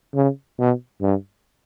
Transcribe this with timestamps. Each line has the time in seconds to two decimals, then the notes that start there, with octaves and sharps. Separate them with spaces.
0.15 C#3
0.59 B2
1.01 G2